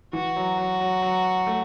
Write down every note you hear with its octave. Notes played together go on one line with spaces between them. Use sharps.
E3 F#4
F#3
F#3
F#3
F#3
A3